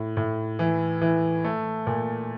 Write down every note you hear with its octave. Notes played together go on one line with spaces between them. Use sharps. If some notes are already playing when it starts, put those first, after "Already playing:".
Already playing: A2
A2
E3
E3
A3
A#2